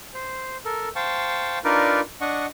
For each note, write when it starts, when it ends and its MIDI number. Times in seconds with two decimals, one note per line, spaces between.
0.14 0.57 72
0.65 0.89 69
0.65 0.89 70
0.96 1.58 72
0.96 1.58 77
0.96 1.58 79
0.96 1.58 81
0.96 1.58 85
1.64 2.01 62
1.64 2.01 63
1.64 2.01 65
1.64 2.01 70
1.64 2.01 71
1.64 2.01 74
2.21 2.46 62
2.21 2.46 75
2.21 2.46 78
2.21 2.46 85